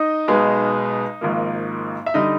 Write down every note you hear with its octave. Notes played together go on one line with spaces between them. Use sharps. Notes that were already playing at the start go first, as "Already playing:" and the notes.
Already playing: D#4 D#5
B1 B2 G#3
G#1 G#2 F3 A#3
E5
D3 G3 D#4 D#5